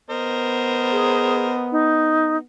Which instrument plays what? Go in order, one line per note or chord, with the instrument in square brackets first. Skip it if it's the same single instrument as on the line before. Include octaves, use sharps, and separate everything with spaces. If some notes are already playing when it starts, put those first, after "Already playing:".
[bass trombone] B3 [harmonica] A#4 C5 D#5
[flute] G#4
D#4